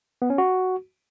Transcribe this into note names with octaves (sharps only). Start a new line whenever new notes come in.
B3
C#4
F#4